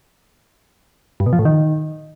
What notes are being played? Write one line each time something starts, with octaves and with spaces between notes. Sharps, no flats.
G2
B2
F3
A2
D#3